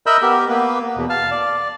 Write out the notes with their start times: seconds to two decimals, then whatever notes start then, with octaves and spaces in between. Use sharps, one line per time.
0.06 A#4 D#5 E5 B5 E6 G6
0.22 B3 G4 A#4
0.49 A#3 B3 B4
0.96 E2 B2
1.10 F5 A5 F6
1.31 D5